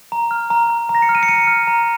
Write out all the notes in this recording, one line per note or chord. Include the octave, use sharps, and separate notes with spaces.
A#5
F6
A#5
F6
A#5
A#6
C#7
F6
D#7
C#7
A#5 D#7
F6
A#5